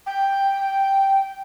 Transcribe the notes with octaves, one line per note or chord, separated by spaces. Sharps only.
G5